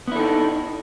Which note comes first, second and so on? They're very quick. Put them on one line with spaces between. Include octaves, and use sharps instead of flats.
B3 E4 A4 D#4